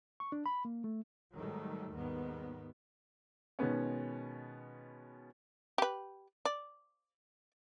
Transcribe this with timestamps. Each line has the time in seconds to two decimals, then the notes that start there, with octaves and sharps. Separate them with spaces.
0.20 C#6
0.32 D4
0.46 B5
0.65 A#3
0.84 A3
1.36 G#2 D#3 F#3 G3 A3
1.93 D#2 G#2 D#3 G3 B3
3.59 B2 D#3 G#3 B3 C#4
5.78 G4 B4
6.45 D5